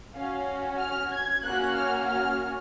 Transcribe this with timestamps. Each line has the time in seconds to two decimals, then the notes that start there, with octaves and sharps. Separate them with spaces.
0.15 C#4 F#4 F5
0.79 F6
1.12 G#6
1.44 A#3 C#4 F#4 F#6
1.77 F6
2.09 F6